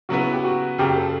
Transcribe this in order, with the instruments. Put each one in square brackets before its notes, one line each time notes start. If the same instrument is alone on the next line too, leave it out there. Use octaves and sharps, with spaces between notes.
[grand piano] C#3 F#3 B3 E4 B4 [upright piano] F#4
[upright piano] G4
F#4
[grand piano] F#2 C#3 F#3 [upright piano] G4
[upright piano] A4